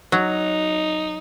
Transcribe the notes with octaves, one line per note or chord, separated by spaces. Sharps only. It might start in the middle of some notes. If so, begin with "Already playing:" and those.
F#3 D#4